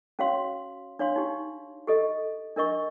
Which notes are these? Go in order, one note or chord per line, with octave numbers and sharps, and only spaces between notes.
C#4 F#4 C#5 F5 C6
D4 C#5 F5 C6
D#4 G4
G4 A4 D#5
D4 A#4 D#5 C#6